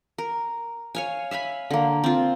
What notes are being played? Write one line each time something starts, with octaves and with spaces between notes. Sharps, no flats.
A#4
C#5 F5 G#5
E5 F5 G#5 B5
D3 A#3
C4 F4